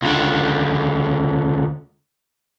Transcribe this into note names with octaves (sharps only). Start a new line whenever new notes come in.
C#2 D3